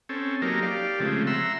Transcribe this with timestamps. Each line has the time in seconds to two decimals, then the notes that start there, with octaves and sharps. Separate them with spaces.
0.09 C4 C#4 A4
0.42 F#3 A#3 D#4 G4 A4 A#4
0.62 G4 D5 F5
1.00 C#3 F3 G#3 A3 C4
1.27 E5 F#5 A#5 C6 E6